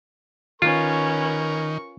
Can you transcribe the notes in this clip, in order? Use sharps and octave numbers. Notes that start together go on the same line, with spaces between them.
D#3 C#4 F4 A#4 B4 C#6